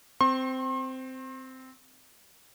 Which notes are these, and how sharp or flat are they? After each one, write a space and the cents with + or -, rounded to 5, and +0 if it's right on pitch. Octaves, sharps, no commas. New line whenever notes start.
C4 -10 C6 +40